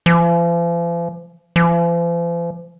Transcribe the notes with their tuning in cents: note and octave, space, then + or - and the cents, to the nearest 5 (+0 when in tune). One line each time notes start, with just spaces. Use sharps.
F3 -45
F3 -45